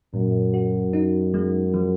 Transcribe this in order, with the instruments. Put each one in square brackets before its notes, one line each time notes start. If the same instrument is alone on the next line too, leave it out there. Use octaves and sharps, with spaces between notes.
[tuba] F#2 [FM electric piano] A#2
[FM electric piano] F#4
D#4
G#3
F3